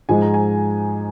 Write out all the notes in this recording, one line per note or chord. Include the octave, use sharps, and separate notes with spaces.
G#2 F3 G#3 G#5
A#5
G#5